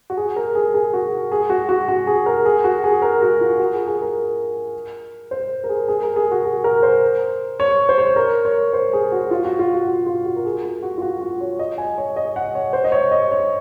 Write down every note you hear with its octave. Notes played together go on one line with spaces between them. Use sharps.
F#4
G#4
A#4
G#4
G#4
F#4
G#4
F#4
F#4
F#4
G#4
A#4
G#4
F#4
G#4
A#4
F#4
F4
F#4
G#4
G#4
A#4
C5
A#4
G#4
G#4
A#4
G#4
F#4
G#4
A#4
C5
C#5
C5
C#5
A#4
C#5
C5
G#4
F#4
F4
F#4
F4
F#4
F#4
F4
F#4
A#4
G#4
F#4
F#4
F4
F#4
F#4
C#5
D#5
G#5
C#5
D#5
F#5
C#5
C5
D#5
C#5
D#5
C#5